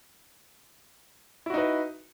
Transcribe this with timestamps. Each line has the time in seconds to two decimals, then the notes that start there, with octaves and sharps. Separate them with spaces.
1.46 E4
1.50 F#4
1.54 D#4
1.58 B4